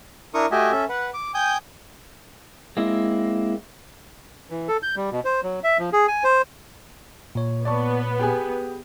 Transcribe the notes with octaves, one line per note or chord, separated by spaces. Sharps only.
D4 E4 A#4 C#6 D#6
A3 F#4 G4 D#5 E5 G#5
C#4 A4 E5
B4 F#5
D6
G5 G#5 D#6 G6
G#3 A#3 C4 E4
E3
A4
G6
G3
B2
C5
F#3
E5
F3
G#4
G#5
C5
A#2 C#5
B3 D5 A5 C#6
G4 G#4 G#5